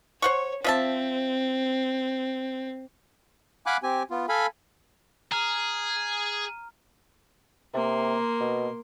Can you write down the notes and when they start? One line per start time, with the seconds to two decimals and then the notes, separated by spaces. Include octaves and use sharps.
0.22 C5 C#5 F#5 C#6
0.64 F3 C4 E5 A5
3.66 F5 F#5 G#5 B5 D6 F#6
3.83 C4 G4 G#5
4.10 B3 F4
4.29 A4 F5 G#5 B5
5.32 G#4 A#5 F6
7.74 C3 A#3 C6
8.40 B2